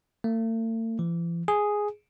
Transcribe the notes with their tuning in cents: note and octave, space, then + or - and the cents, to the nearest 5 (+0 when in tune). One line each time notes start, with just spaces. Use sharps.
A3 +45
E3 +45
G#4 +0